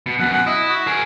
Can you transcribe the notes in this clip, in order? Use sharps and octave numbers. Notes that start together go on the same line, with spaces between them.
B2
F#2 B2 F#5
F#5
E4 D#5
F#4
G#4 A#4